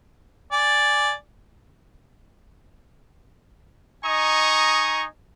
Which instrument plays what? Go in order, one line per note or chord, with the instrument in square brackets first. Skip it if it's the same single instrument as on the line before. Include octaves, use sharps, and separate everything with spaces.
[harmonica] D5 G#5
[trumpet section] D#4 D#5 G#5 A#5 C#6 D#6